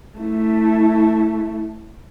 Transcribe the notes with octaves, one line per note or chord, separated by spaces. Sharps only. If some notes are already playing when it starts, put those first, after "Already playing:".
A3 E4